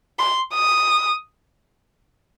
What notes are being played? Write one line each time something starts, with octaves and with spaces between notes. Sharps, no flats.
C6
D#6